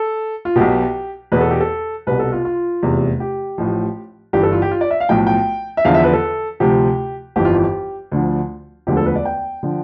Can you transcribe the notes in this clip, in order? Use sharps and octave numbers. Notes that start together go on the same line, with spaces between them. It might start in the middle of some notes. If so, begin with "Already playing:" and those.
Already playing: A4
F4
B1 B2 G4
E2 B2 B4
A4
G4
A4
C2 B2 B4
A4
F4
F4
F1 E2 C3
G4
A1 A2 F3
G1 G2 E3 G4
A4
F4
G4
F4
D5
E5
F5
B1 A2 F3 G5
G5
E5
E2 D3 F3 F5
E5
B4
A4
D2 C3 F3 G4
G1 F2 E3 G4
F4
G4
D2 D3 F3
E1 D2 D3 F3 G4
A4
B4
D5
G5
D3 F3